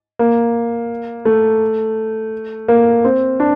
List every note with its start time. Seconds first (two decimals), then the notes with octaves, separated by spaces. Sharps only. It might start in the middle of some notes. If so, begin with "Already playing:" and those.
0.19 A#3
1.25 A3
2.68 A#3
3.04 C4
3.40 D4